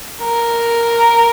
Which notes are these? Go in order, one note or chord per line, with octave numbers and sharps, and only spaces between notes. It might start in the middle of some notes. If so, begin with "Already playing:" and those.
A#4